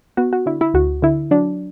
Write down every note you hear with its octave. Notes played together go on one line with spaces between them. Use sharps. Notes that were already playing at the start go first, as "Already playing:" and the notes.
B3 F#4
F#4
D3 E4
E4
D2 F#4
D3 E4
F#3 D4